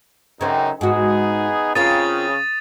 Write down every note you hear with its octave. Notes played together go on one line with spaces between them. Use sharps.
F#2 C#3 C4 D#4
G#2 B3 D#4 F#4 G#4
C#3 C4 F4 A#4 D#6 A6 D#7